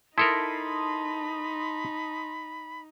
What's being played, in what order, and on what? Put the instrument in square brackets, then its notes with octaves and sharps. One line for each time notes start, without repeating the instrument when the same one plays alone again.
[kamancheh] D#4 [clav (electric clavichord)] E4 A4 A#4 [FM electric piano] A5 C6 D#6 [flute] B5